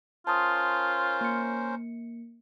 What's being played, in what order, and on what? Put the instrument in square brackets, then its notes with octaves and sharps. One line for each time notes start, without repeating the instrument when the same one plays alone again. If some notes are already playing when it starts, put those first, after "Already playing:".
[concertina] C#4 A#4 C5 [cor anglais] F4 [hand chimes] A5 C6 D#6
[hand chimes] A#3 C#7